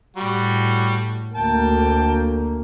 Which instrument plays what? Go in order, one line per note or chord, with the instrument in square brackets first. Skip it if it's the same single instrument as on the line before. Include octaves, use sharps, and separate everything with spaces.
[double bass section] A2 [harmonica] G3 F#4
[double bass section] D2 A#3 [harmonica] G5 A5